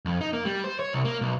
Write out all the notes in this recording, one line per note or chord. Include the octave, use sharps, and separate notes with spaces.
F2
D#4
A#3
G3
C5
C#5
C2
A#3
B1